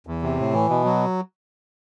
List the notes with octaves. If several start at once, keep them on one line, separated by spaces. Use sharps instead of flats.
E2
C3
A2
E3
B2
F#3